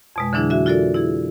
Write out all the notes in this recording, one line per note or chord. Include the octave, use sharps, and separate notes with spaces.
F2 B2 G#3
D3 E3 F#3 D4 E4 G#4
F#4 E5
F4 F#4 A4 A#4 D5
E4 G#4